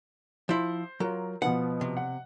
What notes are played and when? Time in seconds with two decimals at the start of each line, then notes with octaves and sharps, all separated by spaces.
0.49 F3 E4 C5
1.00 F#3 F4 A#4
1.42 B2 F3 B3 F#5
1.81 C3
1.97 F#5